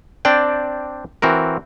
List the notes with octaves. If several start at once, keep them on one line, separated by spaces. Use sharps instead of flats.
C4 D4 D5 G5
E3 C4 F#4 A#4